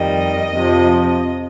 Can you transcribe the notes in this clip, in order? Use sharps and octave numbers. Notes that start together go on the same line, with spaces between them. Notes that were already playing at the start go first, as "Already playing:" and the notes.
Already playing: F2 D#3 G3 D#5
F2 C3 F3